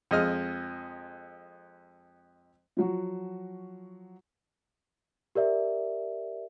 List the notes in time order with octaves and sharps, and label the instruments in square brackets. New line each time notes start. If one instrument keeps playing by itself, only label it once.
[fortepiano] F2 G#3 D#5 F6
[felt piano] F3 F#3 F#4
[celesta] G4 A#4 D5 E5